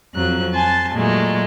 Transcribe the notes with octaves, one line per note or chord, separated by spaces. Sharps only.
F2 F#3 F#6
G#5 A5 C6 A6
A#2 F#3 G#3 A3